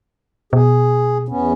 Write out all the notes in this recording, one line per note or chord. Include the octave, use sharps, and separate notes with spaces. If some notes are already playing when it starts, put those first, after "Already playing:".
B2 G#4
E2 B3 C#4